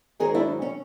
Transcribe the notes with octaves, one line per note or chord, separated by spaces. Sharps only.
G#2 D#3 F#3 G#4 A#4
D4 E4
C#4